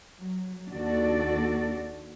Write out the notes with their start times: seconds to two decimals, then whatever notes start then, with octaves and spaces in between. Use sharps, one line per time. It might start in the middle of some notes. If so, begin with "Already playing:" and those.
0.18 F#3
0.73 D#2 D4 F#4 A4 D5